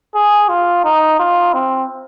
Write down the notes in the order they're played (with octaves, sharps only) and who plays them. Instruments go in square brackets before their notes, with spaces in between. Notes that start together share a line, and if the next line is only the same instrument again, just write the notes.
[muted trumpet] G#4
F4
D#4
F4
C4